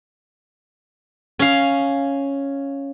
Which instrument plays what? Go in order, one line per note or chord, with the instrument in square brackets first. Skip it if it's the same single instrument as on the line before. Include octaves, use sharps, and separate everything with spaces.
[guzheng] C#4 F5